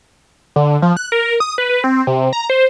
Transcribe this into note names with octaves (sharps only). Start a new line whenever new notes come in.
D3
F3
F#6
A#4
D#6
B4
B4
C4
C3
A#5
C5